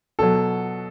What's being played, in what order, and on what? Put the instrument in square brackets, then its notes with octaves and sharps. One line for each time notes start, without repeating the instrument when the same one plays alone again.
[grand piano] B2 F#3 A4